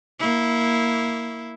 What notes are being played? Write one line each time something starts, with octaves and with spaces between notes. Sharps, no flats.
A#3 E4